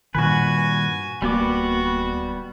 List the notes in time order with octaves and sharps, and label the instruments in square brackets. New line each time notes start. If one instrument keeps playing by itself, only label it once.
[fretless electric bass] G2 A#2 D#3 [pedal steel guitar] F#4 B4 [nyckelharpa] G#5
[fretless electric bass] D1 A#3 [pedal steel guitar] G3 B3 D6 [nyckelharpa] F#4